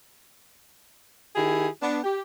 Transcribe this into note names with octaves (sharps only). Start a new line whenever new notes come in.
D#3 E4 G4 G#4
B3 D4
G4